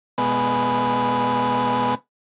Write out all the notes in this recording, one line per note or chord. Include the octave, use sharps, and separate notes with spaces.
B2 G#3 B3